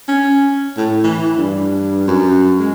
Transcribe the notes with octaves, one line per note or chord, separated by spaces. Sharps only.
C#4
A2
E3
G2
F#2
G#3